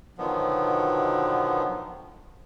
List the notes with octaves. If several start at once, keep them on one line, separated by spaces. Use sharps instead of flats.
B2 D3 D#3 F3 F#3 B3